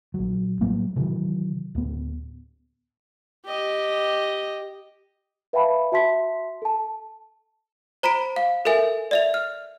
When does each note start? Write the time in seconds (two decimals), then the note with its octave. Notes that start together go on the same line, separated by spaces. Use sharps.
0.14 A#1 F#3
0.61 A2 F#3 G3 A#3
0.96 C3 D#3 E3 F#3
1.75 D1 B3
3.45 G4 D#5
5.53 B4 E5 F5 G5 A5 B5
5.92 F#4 E5 A5 C6 B6
6.62 A4 A5
8.03 C5 A#5 B5 B6 D7
8.36 F5
8.65 A4 A#4 E5 G#5
9.11 D5 E5 F7
9.34 F6